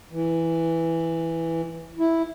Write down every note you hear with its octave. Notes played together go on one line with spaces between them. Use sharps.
E3
E4